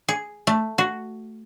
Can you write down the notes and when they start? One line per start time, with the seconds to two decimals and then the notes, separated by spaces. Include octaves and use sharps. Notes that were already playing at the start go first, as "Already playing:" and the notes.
0.09 G#4
0.47 A3
0.78 F#4